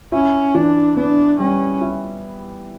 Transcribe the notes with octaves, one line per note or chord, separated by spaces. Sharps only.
C#4 E4
E3 D4
B3 D4
G3 C#4
E4